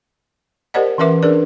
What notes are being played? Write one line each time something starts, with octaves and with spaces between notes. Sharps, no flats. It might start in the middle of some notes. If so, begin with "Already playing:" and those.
G4 A#4 C5 D5 D#5 F#5
E3 C#4 A#4 B4 E5 D6
D4 G#4 A#4 B4 D5